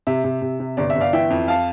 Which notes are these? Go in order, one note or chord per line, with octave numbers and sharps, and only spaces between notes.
C3 E5
C3
C3
C3
G1 D5
E5
G1
D5 F5
E3 E5 G5
F2
F5 A5